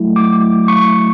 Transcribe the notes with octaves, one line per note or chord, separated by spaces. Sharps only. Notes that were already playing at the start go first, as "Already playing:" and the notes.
Already playing: F#3 A3 E4
D6
C#6